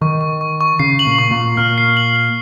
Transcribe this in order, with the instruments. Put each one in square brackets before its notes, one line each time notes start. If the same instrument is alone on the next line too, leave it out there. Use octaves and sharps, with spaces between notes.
[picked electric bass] D#3 [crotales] C#6
[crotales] C#6
C#6
C#6
[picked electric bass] C#3 [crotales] C7
[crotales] F#7
[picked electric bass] A#2
[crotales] C#6
[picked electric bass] A#2
[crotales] C#6
[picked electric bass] A#2 [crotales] F6
[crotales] C7
F#7
F#7